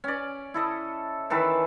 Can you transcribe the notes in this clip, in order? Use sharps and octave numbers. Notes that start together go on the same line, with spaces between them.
C#4 D5
E4 A4 D#5
D#3 E3 A4 B4